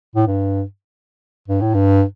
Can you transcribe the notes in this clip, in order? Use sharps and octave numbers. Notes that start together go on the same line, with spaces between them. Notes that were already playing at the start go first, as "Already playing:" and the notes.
A2
G2
G2
A2
G2